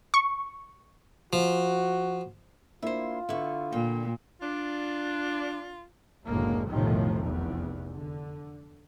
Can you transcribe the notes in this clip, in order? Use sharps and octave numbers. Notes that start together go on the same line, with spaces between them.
C#6
F3 F#4
A#3 D4 E4 F4 C5 E5
D3 B3 E4 C#6
A#2 G5
D4 F4
F#1 D2 A2 F#3 G#3 A#3
F1 B1 A2 C3 D#3 F3
F1 E2
D3